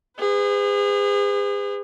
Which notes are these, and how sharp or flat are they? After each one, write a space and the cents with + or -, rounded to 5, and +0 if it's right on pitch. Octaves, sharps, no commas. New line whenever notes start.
G#4 -35 B4 +45